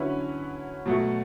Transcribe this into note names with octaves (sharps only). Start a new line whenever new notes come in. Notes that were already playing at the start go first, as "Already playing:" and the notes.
Already playing: D3 F#3 C#4 E4 B4
B2 F#3 A3